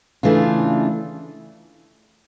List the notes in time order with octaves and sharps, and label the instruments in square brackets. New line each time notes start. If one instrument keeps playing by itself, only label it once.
[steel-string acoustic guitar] C#3 E3 A3 D4 F4